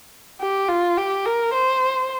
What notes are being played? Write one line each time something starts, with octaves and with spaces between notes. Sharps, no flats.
G4
F4
G4
A#4
C5